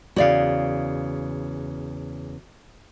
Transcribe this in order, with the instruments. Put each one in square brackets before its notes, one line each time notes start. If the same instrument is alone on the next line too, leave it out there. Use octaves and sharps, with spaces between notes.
[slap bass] E2 C#3 [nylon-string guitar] F#4 D5 F5